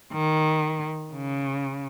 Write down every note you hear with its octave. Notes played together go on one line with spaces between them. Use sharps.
D#3
C#3